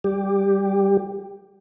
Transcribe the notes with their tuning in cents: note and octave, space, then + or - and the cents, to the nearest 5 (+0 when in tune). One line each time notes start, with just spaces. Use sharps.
G3 +0 G4 +10